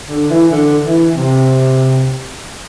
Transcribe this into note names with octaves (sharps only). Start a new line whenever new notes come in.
D3
E3
D3
E3
C3